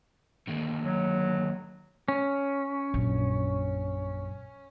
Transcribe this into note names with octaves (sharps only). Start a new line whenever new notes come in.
D3 D#3 A#3
F#3
C#4
A#1 F#2